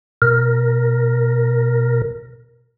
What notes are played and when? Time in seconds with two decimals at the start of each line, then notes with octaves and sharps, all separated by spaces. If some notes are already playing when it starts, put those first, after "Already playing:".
0.22 B2 A#4